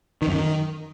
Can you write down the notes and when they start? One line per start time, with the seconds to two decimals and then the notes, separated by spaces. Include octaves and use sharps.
0.22 D#3
0.28 F#2
0.33 D#3